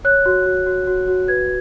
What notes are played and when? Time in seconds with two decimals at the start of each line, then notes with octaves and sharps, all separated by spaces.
0.05 C#5 F#6
0.26 F#4
0.46 F#4
0.66 F#4
0.87 F#4
1.08 F#4
1.28 B4 G#6